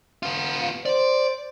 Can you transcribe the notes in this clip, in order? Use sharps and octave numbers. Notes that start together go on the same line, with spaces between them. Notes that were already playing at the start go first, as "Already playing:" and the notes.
B3 F4
C5 D5